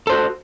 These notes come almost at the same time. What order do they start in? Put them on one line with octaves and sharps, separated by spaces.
A4 C5 F#4